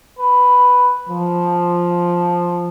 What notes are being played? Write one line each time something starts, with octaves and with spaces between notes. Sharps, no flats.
B4
F3